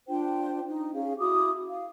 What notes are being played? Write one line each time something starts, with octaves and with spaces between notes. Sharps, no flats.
D4 F4 C5 G5
D#4
C#4 G#4 F5
E4 F#4 D6 D#6
F5